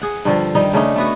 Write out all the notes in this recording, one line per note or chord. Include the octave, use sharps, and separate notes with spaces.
G#4 F#5
G2 D3 F3
D#3 G3 D#4
C#3 A3 D4 D#4
A3 B3 F#4